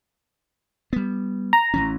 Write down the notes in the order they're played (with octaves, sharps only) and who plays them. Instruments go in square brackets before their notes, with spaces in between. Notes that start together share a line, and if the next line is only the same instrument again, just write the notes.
[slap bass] G3 B3
[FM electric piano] A#5
[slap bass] A1 E3 C#4